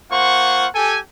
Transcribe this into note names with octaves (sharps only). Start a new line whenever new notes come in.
A#3 F4 C5 F#5 C#6
G4 A4 G#5